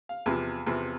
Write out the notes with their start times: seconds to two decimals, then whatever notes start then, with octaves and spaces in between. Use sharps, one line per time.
0.09 F5
0.26 E2 C3 F3
0.66 E2 C3 F3 C4